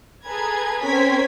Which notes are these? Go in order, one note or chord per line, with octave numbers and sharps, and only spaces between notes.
G#4 A4 B4 A#5 G#6
C4 C#4 A#4 G#6 B6